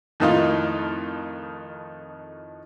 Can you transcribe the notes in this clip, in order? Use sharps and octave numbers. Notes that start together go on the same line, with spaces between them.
F2 A2 D#3 D#4 F4